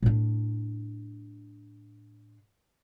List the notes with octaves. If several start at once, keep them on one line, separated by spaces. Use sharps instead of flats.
A2 D4